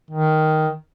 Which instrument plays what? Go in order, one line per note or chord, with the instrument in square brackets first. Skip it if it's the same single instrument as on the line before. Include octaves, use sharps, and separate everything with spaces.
[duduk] D#3